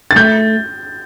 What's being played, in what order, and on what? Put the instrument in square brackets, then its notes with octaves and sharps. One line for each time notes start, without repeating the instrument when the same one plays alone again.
[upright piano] A6
[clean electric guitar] A3 [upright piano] G6